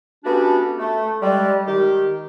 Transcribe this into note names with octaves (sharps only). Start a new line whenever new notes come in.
A3 B3 C#4 D4 F#4 G4
A3
G3 G#3
D#3 G4